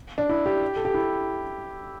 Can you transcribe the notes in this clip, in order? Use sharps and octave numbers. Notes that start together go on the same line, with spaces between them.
D4
E4
G4
A4
G4
E4